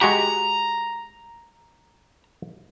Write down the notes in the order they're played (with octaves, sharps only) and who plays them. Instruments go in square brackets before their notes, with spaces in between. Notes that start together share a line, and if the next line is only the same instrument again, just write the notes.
[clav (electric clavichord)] G#3 F#4 G4 [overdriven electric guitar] A#5